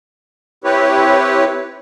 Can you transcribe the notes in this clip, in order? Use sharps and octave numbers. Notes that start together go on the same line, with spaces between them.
C4 E4 G4 B4 C#5